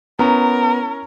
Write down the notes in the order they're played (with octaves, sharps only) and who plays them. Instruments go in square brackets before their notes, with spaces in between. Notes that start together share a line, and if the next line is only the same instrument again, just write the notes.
[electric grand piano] B3 [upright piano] C#4 E4 A#5 [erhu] A#4